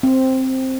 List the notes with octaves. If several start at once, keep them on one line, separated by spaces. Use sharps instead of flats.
C4